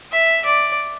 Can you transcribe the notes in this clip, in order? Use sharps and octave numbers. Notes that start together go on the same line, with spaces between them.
E5
D5